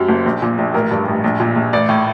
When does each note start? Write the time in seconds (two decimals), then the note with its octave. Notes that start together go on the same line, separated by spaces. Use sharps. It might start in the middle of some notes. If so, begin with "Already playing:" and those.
Already playing: F#2 F#3 G4
0.09 F#1
0.26 A#1
0.42 A#2
0.58 A#1
0.74 A1 A#4
0.91 G2
1.08 A1
1.24 A#1
1.40 A#2
1.56 A#1
1.73 A1 D5
1.89 A2